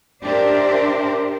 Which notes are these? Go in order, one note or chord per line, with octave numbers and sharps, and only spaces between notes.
D4 G4 A#4 C5 D5 E5